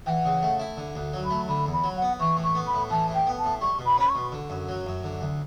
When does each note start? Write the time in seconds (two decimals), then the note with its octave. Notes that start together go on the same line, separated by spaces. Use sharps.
0.06 E3 G5
0.10 F#5
0.25 C#3
0.42 A3
0.59 E4
0.77 D3
0.95 D2
1.13 F#3
1.25 B5
1.30 A3
1.48 D3 B5
1.66 E2
1.73 B5
1.84 F#3
1.96 F#5
2.02 B3
2.20 E3 C#6
2.37 A2
2.43 C#6
2.55 B3
2.67 B5
2.73 A2
2.90 E3 A5
3.08 A2
3.14 G5
3.27 B3
3.38 A5
3.44 A2
3.61 G3 C#6
3.79 B2
3.85 B5
3.98 C#4 B5
4.09 C#6
4.15 B2
4.32 D3
4.50 F#2
4.69 F#3
4.87 F#2
5.04 D3
5.21 D2